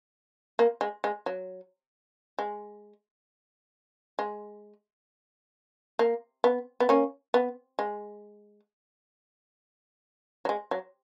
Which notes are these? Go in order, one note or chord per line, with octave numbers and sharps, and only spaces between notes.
A#3
G#3
G#3
F#3
G#3
G#3
A#3
B3
B3
A#3 C#4
B3
G#3
F#3
G#3
F#3